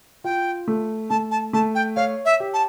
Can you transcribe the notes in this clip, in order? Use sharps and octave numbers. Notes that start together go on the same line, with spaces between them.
F4 G5
A3
A3 A5
A5
A3 A5
G5
C#5 F5
E5
G4
A5